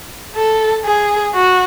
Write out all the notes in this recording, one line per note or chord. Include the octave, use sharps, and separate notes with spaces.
A4
G#4
F#4